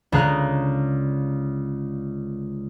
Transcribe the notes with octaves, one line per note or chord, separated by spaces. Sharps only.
C#2 D3 G#4 A#5 F#6